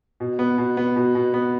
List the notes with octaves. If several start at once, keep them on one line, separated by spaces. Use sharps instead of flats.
B2
B3
B2
B3
B2
B2
B3